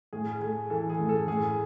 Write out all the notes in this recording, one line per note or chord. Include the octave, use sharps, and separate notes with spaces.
A2 G#4
A3 G#4
E3 A4
G#4
A2
A4
A2 G#4